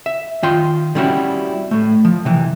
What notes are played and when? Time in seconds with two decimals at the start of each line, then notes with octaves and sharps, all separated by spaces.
0.06 E5
0.43 D#3 F4 G5 C6
0.95 D3 G3 C4 C#4 E4 F#4
1.71 A2 A3
2.05 F3
2.25 C3 E3